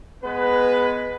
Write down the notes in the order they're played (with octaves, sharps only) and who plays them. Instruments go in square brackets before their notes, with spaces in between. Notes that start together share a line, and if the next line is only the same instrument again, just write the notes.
[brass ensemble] G#3 B3 B4